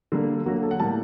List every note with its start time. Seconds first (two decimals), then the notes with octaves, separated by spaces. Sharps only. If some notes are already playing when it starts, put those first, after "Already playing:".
0.12 D3 G3 A#3
0.46 D3 F#3 A#3 F#4
0.63 A4
0.71 F#5
0.80 A2 G3 A#3 A5